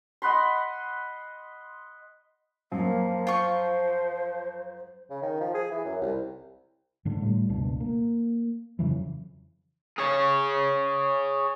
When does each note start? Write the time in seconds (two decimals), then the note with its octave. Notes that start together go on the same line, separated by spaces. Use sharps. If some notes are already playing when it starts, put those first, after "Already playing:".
0.22 D#5 F#5 B5 C6
2.72 F#2 F3 A#3
3.27 F4 C5 C#6
5.10 C#3
5.22 D#3
5.40 F3
5.54 G#4
5.71 E3
5.85 F#2
6.01 C2
7.05 G#2 D3
7.21 A2 G3
7.49 F#1 C#2 B2 D4
7.80 A#3
8.79 F2 C#3 E3 F#3
9.98 G#4 C#5